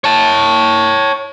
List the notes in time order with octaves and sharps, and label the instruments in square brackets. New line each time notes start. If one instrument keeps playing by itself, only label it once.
[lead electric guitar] C#5 A5